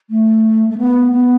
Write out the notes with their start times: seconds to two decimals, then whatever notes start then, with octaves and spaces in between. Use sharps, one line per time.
0.10 A3
0.70 A3
0.78 B3
1.12 B3